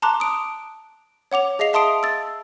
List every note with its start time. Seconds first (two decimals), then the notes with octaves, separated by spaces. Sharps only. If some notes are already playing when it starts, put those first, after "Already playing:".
0.02 A5 A#5 C6 D6 F#6
0.20 D#6 D7
1.31 C#5 F#5 D6 F7
1.59 G#4 D#5 F5 C7 F7
1.73 E5 A5 C6 D#6 D7
2.03 E6 A6